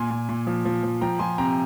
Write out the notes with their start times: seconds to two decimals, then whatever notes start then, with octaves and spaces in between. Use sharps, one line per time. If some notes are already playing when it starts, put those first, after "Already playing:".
Already playing: A#2 G#5 C6
0.11 A#2
0.29 A#2
0.47 F3
0.65 F3
0.83 F3
1.01 F3 G5 A#5
1.19 F3 G#5 C6
1.38 C3 G5 A#5